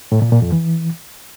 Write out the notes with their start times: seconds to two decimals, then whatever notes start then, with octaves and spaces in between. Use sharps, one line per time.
0.12 A2
0.22 A#2
0.32 A#2
0.42 F2
0.52 E3